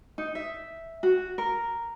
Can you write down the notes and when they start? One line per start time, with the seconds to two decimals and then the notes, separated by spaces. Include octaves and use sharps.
0.18 D#4
0.35 E5
1.03 F#4
1.38 A#4